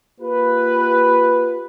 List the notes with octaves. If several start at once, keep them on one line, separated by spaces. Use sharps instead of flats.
A#3 F4 G4 B4